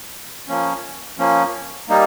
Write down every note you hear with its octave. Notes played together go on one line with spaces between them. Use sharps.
F3 A#3 C#4
F3 A#3 C#4
G3 A#3 D#4